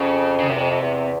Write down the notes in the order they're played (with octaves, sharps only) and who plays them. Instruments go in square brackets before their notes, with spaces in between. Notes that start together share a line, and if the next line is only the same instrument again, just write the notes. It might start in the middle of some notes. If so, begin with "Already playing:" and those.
Already playing: [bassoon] F2 [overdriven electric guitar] C#3
[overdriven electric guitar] C#3
[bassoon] F#2 [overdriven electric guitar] C3
[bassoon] E2
F2
F2
E2